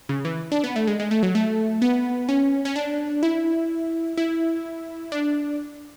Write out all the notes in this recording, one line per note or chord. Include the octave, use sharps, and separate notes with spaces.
C#3
E3
D4
B3
A3
G#3
G#3
A3
F#3
A3
B3
C#4
C#4
D4
E4
E4
D4